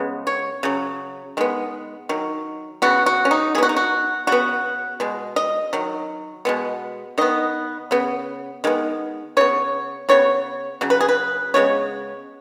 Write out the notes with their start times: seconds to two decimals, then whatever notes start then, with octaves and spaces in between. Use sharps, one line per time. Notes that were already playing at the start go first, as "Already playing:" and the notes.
Already playing: C#3 G#3 B3
0.27 C#5
0.63 C#3 F#3
1.37 D#3 G#3 B3
2.09 D#3 F#3
2.82 C#3 B3 F#4
3.06 F#4
3.25 C#4
3.31 D#4
3.55 D#3 G#4
3.58 B3 F#4
3.69 D#4
3.76 F#4
4.27 C#3 B3 F#4
5.00 B2 G#3
5.36 D#5
5.73 D#3 F#3
6.45 B2 G#3 B3
7.18 D#3 B3 D#5
7.91 C#3 B3
8.64 D#3 G#3 B3
9.37 C#3 B3 C#5
10.09 C#3 B3 C#5
10.81 C#3 F#3
10.90 B4
11.01 G#4
11.09 B4
11.54 C#3 G#3 B3 C#5